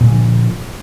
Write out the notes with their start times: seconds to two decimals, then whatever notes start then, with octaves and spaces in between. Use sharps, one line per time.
0.01 A#2
0.05 G#3
0.09 D3
0.12 F3